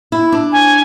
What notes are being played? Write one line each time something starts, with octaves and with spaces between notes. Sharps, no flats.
E4
D4
G#5